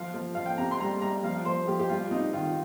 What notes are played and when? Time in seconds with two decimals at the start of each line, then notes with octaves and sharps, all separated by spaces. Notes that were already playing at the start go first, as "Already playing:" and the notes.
Already playing: F3 F5
0.14 F3
0.35 F3 F5
0.46 G5
0.58 C3 A#5
0.71 C6
0.80 G3 A#5
1.01 G3 A#5
1.23 F3 F5
1.45 F3 C5
1.68 F3 G4
1.79 G4
1.90 G3 F4
2.11 C3 D#4
2.33 D#3 F4